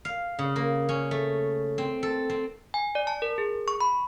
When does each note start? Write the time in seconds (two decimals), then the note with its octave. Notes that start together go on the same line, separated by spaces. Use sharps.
0.05 F5
0.39 C#3
0.56 A#3
0.89 C#4
1.11 A3
1.78 C4
2.03 A4
2.30 C4
2.74 G#5
2.95 D5
3.07 A5
3.22 A#4
3.38 G#4
3.68 C#6
3.81 B5